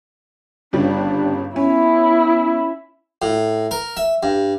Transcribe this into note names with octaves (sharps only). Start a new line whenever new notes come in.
G1 C#3 G3 D4
B3 C#4 E4
A2
A#4
E5
G2